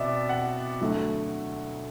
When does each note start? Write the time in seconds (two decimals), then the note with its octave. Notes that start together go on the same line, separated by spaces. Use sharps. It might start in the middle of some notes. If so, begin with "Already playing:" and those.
Already playing: B2 C4 D5 E5
0.29 F#5
0.81 D2 D3 F#3 A3